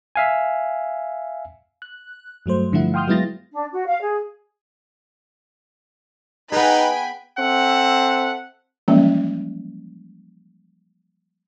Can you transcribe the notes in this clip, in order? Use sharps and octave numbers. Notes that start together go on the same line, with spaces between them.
E5 F5 G#5
F#6
G2 F#3 A3 C5
G2 D3 F3 A3 E4 F#5
F5 G5 C6 D#6 F6 G6
F#3 G#3 B3 E4 A6 A#6
D4
F#4
F5
G#4
B3 D#4 G#4 B4 G5 G#5 B5
C4 A4 E5 F#5
E3 F3 G3 G#3 A#3 C#4